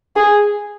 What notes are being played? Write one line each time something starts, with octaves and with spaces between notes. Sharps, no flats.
G#4